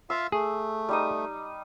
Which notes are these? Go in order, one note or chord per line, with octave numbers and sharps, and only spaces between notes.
F4 E5 F5 E6
A3 G#4
G3 D#4 D#6